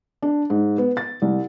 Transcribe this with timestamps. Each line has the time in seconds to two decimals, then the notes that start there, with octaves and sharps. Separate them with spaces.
0.22 D4
0.50 G#2
0.78 B3
0.97 A6
1.22 C2